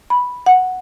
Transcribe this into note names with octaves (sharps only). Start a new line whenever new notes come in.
B5
F#5